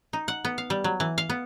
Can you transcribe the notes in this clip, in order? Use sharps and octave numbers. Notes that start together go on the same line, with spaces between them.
D#4
F#5
B3
F5
G3
F#3
E3
F5
B3